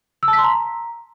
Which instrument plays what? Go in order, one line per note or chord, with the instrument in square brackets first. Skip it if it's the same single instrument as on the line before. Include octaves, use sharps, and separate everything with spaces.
[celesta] E6
A5
B6
C6
A#5